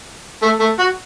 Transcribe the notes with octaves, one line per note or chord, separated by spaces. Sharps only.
A3
A3
F#4